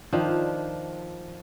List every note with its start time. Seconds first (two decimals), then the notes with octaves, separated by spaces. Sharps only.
0.12 D#3 F3 D4